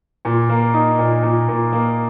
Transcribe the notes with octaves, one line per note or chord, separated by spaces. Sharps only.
A#2
A#3
D#4
A#2
A#2
A#2
A#3